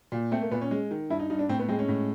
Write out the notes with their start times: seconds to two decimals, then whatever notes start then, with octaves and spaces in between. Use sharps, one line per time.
0.12 A#2
0.32 A3 C4
0.42 A#3
0.51 A#2 B3
0.61 C#4
0.71 G#3
0.91 D#3
1.10 G2 E4
1.19 D#4
1.30 G2 D#4
1.39 D4
1.49 A2 C4
1.59 B3
1.69 G#3 C4
1.79 C#4
1.88 A2